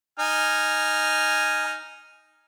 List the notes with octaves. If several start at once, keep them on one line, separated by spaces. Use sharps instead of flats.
D#4 G#5 F6